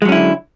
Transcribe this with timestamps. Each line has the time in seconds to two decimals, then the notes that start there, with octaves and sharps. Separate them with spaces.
0.02 G#3
0.05 F#3
0.09 C#4
0.12 E4
0.15 D3